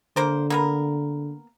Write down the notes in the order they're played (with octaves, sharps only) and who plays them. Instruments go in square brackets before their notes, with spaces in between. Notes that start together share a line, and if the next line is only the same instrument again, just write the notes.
[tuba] D3 [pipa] A#3 A#4 C5
[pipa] A#3 B3 A#4